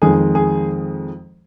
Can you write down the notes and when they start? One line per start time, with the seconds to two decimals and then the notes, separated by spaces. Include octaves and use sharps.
0.02 F2 D#3 G#3 G#4
0.35 G#4